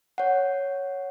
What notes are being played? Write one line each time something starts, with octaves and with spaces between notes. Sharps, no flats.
C#5 F#5